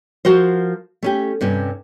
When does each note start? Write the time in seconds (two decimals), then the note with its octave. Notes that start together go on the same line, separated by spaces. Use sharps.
0.25 F3 F#4 A#4 C5
1.03 A3 C#4 G4
1.41 G2 C3 C#4